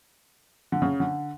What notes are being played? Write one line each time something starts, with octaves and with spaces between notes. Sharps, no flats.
D3
C#3
D3